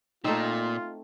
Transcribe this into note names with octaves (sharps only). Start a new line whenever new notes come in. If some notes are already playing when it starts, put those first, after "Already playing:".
A#2 A3 C4 D#4 F4 E6